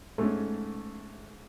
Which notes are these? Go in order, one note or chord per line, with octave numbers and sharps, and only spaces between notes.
G#2 G#3 A3 C#4